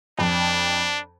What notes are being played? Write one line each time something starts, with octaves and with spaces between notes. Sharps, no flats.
F2 D4